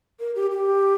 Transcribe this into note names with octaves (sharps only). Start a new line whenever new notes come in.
A#4
G4
G4